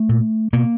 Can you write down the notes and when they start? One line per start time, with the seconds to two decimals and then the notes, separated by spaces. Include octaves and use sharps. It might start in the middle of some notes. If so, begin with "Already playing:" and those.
Already playing: A3
0.09 A#2
0.53 B2 A#3